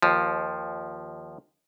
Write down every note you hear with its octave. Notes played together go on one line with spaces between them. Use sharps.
D#2 F3